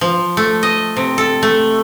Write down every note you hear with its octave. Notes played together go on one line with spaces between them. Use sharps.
F3
A3
D#5
C3
A4
A3